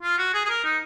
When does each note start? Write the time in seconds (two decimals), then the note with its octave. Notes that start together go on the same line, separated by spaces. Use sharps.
0.03 F4
0.18 F#4
0.34 G#4
0.45 G#4
0.49 A#4
0.64 D#4